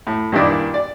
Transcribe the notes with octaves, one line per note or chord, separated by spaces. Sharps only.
A2
G2 A#2 D#3 D4 E4
D5